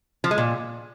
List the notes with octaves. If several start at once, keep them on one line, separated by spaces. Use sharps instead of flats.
F3
G#3
A#2